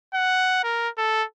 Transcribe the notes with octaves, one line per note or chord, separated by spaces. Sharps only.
F#5
A#4
A4